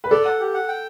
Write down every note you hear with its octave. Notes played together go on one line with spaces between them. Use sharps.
B4
A4 D5
F#5
G4
F#5
G5